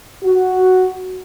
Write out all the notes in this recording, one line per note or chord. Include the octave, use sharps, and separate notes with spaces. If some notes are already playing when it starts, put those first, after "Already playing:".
F#4